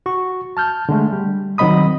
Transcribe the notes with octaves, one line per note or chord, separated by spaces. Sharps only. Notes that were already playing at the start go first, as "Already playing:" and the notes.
F#4 C#6
A5 F6 G6
D3 G#3 A3
G3
D#3 F#3 C4 D#5 B5 D#6